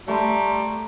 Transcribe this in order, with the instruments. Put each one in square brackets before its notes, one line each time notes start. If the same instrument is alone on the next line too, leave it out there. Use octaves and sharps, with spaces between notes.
[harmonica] G3 [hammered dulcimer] A3 A#5 C6